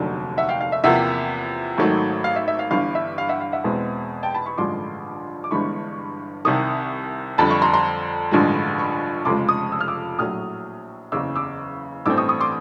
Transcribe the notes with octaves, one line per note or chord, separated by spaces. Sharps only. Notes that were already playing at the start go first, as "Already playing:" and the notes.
Already playing: F1 D#2 D3 F#3
E5 F#5
F5 G5
F5
E5
E2 C3 F3 A#3 E5 F#5
G#1 G#2 D#3 F#3 A3
F5
E5
E5
F5
G1 G2 E3 F5
E5
F5
E5 F#5
F5
E5 F#5
E2 B2 G#3 C4
G5 A5
A5 B5
B5 C#6
A1 G2 D3 F3 G#3 C6 D6
D6
G1 G2 E3 G#3 B5 C#6
C2 C3 D#3 C#6 D#6
F2 D3 G3 A5 B5
B5 C#6
A#5 C6
A#5 C6
A1 G2 D3 F3 G#3
B5 C#6
F1 F2 C#3 F3 G#3 C6 D6
C#6 D#6
E6
F6
D6 E6
A#1 A2 F#3 D#6 F6
F#1 E2 C#3 D6 E6
D6 E6
A1 G2 E3 A3 C4 D6 E6
C#6 D#6
C#6 D#6
C6 D6